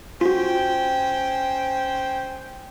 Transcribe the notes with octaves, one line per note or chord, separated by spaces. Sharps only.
C#4 F4 F#4 C5 G5